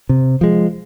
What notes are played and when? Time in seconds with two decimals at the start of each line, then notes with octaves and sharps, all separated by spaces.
0.09 C3
0.41 F3 G#3